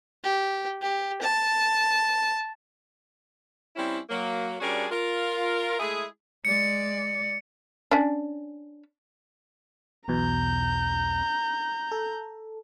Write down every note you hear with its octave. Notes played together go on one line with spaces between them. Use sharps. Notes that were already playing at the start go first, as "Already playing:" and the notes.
G4
G4
A5
G3 C4 C#4 E4
F#3 A#3
G3 C#4 D4 F#4 G#4 A#4
F4 A#4
G#3 A3 E4 G#4
G#3 D5 C#7
C#4 D4
B1 E2 B2 A#5 G6
A4